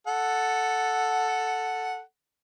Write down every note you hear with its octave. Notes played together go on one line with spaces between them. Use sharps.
A4 F#5